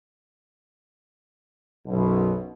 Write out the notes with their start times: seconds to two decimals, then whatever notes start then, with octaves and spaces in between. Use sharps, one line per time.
1.87 B1 F#2 B2